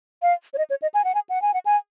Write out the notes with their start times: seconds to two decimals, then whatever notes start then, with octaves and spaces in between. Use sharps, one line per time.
0.22 F5
0.54 C#5
0.58 D#5
0.70 C#5
0.82 D#5
0.94 G#5
1.04 F#5
1.15 G#5
1.29 F#5
1.42 G#5
1.54 F#5
1.66 G#5